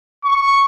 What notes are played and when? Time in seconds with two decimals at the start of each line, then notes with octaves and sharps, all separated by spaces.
0.24 C#6